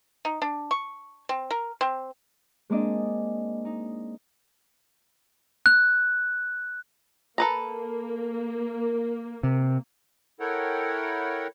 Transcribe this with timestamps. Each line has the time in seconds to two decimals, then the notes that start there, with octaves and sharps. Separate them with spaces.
0.25 D#4
0.42 D4
0.71 C#6
1.29 C4
1.51 A#4
1.81 C4
2.70 G#3 A#3 C4 D4 D5 D#5
3.65 D#4
5.66 F#6
7.38 A#3 A4 B4 A#5
9.43 C3
10.40 E4 A4 A#4 C#5 F#5 G5